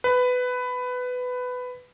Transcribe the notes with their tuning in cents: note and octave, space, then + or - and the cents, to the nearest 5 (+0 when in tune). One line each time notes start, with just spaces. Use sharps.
B4 +15